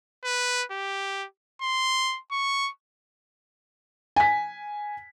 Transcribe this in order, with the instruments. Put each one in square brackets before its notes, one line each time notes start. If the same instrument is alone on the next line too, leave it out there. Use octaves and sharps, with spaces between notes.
[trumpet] B4
G4
C6
C#6
[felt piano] G#5 B6